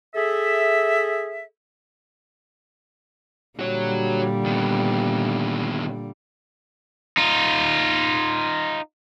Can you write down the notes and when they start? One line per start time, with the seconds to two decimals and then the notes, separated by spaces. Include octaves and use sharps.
0.15 G#4 A4 E5
3.59 A#2 D3 G3 F#4 C#5
4.46 D#3 B3
7.17 D#4 F4